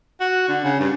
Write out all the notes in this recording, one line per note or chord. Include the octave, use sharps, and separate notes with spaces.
F#4
D3
C#3
G2